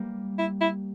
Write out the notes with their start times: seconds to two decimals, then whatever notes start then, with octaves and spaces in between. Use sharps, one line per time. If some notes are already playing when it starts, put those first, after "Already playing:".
Already playing: G3 A#3
0.39 E4
0.61 E4